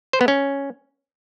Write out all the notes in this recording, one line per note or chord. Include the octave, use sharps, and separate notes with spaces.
C5
B3
C#4